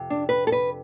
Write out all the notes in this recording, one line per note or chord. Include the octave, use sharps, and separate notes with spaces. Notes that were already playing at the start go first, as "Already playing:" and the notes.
Already playing: F2 C3
D4
B4
A4
B4